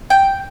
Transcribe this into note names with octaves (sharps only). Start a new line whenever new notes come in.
G5